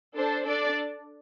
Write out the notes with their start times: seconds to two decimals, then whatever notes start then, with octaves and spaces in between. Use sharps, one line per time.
0.16 D4 A4 C5
0.46 D4 A4 D5